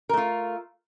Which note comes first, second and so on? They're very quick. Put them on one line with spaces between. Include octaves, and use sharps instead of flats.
A#4 A3 F4